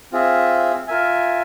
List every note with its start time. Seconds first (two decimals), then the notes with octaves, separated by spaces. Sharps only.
0.12 C4 F4 G#4 E5
0.88 F4 A#4 E5 G#5